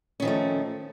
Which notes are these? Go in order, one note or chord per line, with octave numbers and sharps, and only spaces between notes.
D#3 F3 A3 C#4